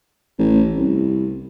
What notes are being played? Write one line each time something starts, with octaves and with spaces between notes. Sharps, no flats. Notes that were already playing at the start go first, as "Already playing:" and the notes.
A1
C2